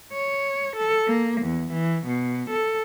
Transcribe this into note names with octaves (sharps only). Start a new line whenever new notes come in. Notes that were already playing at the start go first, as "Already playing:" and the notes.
C#5
A4
A#3
E2
E3
B2
A4